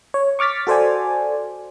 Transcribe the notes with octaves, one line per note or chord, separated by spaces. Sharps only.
C#5
C#6 D6 F6 A6 B6
F#4 A4 C5 D5 G#5